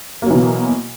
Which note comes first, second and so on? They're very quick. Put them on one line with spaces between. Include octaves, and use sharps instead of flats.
A#3 F#3 E3 B2